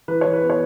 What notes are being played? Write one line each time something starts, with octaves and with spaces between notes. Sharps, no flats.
E3 B4
E3 C#5
B4
B3
C#5